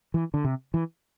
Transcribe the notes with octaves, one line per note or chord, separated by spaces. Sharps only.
E3
D3
C3
E3